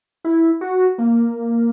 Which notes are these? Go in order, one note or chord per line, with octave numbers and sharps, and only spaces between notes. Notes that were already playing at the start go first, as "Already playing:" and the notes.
E4
F#4
A#3